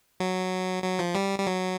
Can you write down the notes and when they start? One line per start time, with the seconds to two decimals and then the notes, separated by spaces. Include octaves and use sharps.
0.20 F#3
0.84 F#3
0.99 F3
1.15 G3
1.39 G3
1.47 F#3